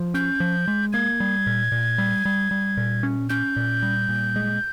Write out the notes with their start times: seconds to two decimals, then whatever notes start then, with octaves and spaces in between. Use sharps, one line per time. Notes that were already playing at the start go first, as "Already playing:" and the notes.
Already playing: F3
0.14 C#4 G6
0.40 F3
0.68 G#3
0.93 A#3 G#6
1.20 G3
1.47 A#2
1.72 A#2
1.98 G3
2.25 G3
2.51 G3
2.77 A#2
3.03 C#4
3.29 C#4 G6
3.56 A#2
3.82 G3
4.09 A#2
4.36 G#3